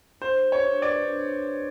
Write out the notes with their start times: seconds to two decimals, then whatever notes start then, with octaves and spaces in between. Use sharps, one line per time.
0.21 D4 C5
0.42 G4
0.52 C#5
0.62 D4
0.82 B4 D5
1.03 D4